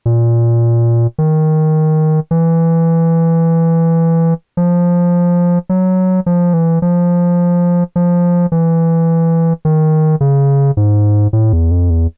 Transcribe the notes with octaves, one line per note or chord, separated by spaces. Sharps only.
A#2
D#3
E3
F3
F#3
F3
E3
F3
F3
E3
D#3
C#3
G#2
A2
E2
F2
E2